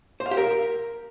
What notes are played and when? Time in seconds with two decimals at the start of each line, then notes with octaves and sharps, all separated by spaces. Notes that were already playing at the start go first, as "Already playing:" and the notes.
0.20 C5
0.26 F5
0.31 G4
0.37 A#4